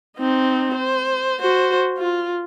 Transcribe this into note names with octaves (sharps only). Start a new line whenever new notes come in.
C4 D#4
C5
F#4 C5
F4